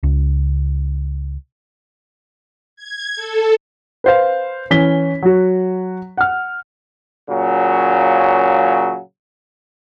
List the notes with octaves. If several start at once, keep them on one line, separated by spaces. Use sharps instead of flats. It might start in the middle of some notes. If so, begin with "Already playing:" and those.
C#2
G#6
A4
B4 C5 F5
E3 C#4 B6 G7
F#3 F#4
F#5 F6
A#2 C#3 F#3